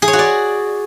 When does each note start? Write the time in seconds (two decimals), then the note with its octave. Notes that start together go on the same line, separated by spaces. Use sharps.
0.02 G#4
0.08 C#5
0.13 F#4
0.19 D5